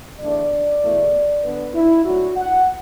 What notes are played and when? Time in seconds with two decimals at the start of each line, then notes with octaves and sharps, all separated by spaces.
0.20 E2 D3 A3 D4 D5
0.82 E2 B2 A3 E4
1.43 D3 B3 D4 B4
1.74 E4
2.05 A2 F#3 D4 F#4
2.36 F#5